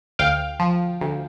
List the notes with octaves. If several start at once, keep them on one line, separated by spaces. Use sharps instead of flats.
D2 F5 G5
F3
D2